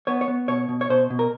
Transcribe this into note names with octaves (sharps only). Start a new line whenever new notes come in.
B3 C#5
C#5
B3
B2 C#5
B2
C#5
B2 C5
B2
A#4